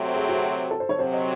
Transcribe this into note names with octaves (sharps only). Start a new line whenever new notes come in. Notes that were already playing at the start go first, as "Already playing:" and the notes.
Already playing: C3 F#3 A3 C4
G#4
F#4
A4
C5
C#5
C3 F#3 C4 C5
D#5